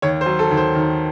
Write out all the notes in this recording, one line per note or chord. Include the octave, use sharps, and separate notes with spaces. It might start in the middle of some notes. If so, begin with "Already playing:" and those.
D#2 C#5
C5
F#3
A4
D#2
C5
D#3